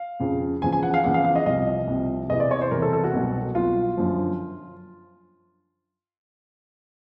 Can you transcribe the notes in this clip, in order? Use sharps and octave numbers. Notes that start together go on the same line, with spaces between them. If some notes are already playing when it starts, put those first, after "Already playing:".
Already playing: F5
F2 C#3 F3
E2 C#3 F3 G#5
G#5
F#5
F5
E2 C#3 F3 F#5
F5
F5
D#5
C2 C3 F3 D#5
C2 C3 F3
E2 C3 E3 D#5
D5
C#5
C5
E2 C3 E3 A#4
A4
A4
F#4
C2 B2 F#3
C2 B2 F#3 F4
F#2 D3 F3